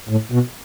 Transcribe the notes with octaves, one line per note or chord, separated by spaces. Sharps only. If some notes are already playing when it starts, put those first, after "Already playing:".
A2
B2